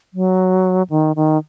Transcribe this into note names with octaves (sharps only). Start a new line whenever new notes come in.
F#3
D#3
D#3